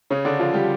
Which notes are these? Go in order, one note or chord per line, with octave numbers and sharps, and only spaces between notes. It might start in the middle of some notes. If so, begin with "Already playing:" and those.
C#3 C#4
D3 D4
F3 F4
G3 G4